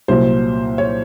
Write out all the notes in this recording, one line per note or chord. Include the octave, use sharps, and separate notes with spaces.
C2 A#2 F#3 C5
C#5